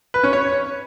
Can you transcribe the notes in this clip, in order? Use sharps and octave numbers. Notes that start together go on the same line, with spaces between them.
B4
C#4
C#5